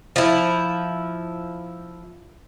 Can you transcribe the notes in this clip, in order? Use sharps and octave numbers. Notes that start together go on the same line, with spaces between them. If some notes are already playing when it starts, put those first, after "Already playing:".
F3 E4